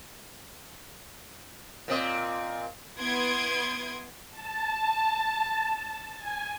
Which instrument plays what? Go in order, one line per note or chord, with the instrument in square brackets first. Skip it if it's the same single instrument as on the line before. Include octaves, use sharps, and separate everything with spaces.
[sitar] A#2 C4 D#5
[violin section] B3 E4 C6 D#6 G#6 D7
[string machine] A5
G#5